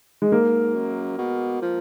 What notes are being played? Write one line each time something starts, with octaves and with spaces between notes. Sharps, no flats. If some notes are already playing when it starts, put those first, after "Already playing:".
G#3
G#2 A#3
F#2
B2
F3